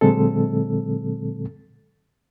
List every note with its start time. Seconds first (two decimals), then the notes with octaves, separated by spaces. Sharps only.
0.01 A#2 D3 F#3 G#3 C4 A4